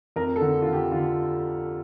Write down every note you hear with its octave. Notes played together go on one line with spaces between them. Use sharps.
F2 A#4
A4
D3
F4
D3
G4
D3 F4